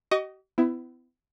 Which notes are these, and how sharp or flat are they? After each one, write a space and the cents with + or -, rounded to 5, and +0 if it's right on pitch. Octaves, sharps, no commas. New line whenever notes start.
G4 -45 D#5 +0 C#6 +35
B3 +40 E4 +15